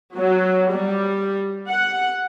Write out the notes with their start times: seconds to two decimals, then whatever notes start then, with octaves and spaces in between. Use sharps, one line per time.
0.16 F#3
0.72 G3
1.69 F#5